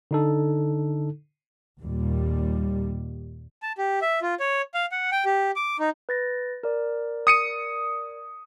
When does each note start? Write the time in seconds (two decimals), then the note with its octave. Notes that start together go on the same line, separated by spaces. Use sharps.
0.11 D3 D#4 A4
1.82 D#2 A#2 G3
3.62 A5
3.78 G4
4.02 E5
4.22 F4
4.40 C#5
4.74 F5
4.92 F#5
5.12 G5
5.25 G4
5.56 D6
5.79 D#4
6.09 B4 A6 A#6
6.63 A#4 D5
7.27 D#6 C#7 D#7